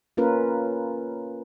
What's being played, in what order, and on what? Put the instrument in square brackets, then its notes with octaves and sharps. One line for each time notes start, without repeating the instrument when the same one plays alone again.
[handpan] A#3 C#4 F4 A#4 B4